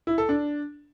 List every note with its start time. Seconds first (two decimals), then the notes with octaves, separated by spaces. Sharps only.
0.07 E4
0.18 A4
0.29 D4